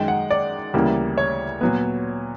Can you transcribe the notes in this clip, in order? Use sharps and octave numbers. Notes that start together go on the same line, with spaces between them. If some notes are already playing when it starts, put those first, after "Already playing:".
Already playing: F#2 D#3 G#3 G5
F#5
D5
D2 C#3 E3 G3 A#3
C#5
A#2 F#3 B3